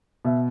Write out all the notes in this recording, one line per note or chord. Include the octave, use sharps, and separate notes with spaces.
B2 E5